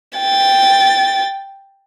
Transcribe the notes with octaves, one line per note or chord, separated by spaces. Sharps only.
G5 A6